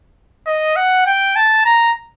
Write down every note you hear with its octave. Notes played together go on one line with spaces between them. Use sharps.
D#5
F#5
G5
A5
A#5